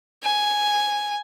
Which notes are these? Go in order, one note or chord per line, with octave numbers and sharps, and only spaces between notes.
G#5